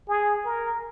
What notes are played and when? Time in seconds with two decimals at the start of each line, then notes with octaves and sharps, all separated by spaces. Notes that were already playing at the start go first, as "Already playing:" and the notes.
0.08 G#4
0.45 A#4